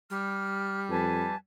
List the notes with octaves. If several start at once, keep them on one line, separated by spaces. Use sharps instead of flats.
G3 F6
F2 B4 G#5 A5